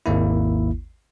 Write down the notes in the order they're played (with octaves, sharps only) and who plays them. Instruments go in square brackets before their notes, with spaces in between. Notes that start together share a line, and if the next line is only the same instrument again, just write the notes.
[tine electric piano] G#1 D#2 A#3 E4